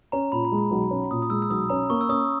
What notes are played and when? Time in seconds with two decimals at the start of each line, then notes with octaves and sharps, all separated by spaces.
0.12 C#4 A#5
0.32 A#2 B5
0.45 A#5
0.52 G#3
0.58 B5
0.71 B1
0.91 C#4
1.11 A#2 D#6
1.22 D#6
1.30 G#3 E6
1.42 E6
1.50 B1 D#6
1.70 C#4 A#5
1.90 A#3 C#6
2.01 E6
2.09 C#4 D#6